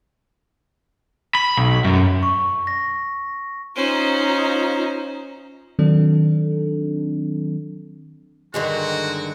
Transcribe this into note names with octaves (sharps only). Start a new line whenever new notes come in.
B5
B1
F#2
C#6
A#6
C#4 D#4 F4 C5 A#5
D#3 F#3 C4 D4 A4
G2 D3 D#3 G#3 F#4 A#4 C5